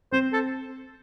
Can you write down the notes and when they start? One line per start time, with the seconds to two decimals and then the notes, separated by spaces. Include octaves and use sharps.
0.12 C4 C5
0.33 A4